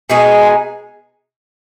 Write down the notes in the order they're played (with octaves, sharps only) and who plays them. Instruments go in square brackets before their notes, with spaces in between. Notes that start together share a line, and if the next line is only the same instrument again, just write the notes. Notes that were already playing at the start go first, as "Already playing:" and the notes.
[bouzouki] B2 G#3 D#4 G#4 [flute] G#5